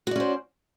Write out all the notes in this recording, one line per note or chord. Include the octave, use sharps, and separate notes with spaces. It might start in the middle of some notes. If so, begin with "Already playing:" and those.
C#4 F#4 C5 D5